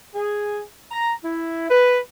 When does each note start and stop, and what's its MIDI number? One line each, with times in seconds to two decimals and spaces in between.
0.15 0.61 68
0.91 1.13 82
1.24 1.69 64
1.70 1.97 71